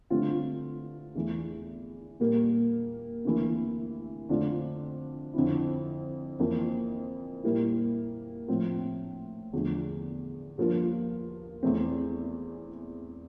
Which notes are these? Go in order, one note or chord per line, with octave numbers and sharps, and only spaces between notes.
G2 D3 A3 C4 F4
E2 E3 A3
A#2 G3 A#3
D2 C3 E3 A#3 E4
F2 D3 A3 D4 F4
F2 D3 F3 C4 E4
F2 E3 A#3 F4
A#2 G3 A#3 E4
A2 F3 C4
E2 D3 F3 A3
G2 F3 A#3 F4
E2 E3 A3 C4